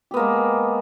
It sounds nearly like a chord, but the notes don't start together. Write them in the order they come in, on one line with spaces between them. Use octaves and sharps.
G4 B3 A#3 G#3